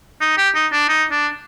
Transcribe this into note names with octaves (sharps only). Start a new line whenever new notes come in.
D#4
G4
D#4
D4
D#4
D4